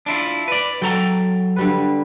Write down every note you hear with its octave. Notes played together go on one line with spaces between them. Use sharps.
D4 E4 F4
B4 D5
F#3 A4 G5 A#5
D3 G3 B4